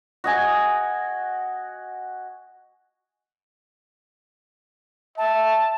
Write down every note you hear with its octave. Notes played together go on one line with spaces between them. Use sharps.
F#4 D#5 G#5
E5 A5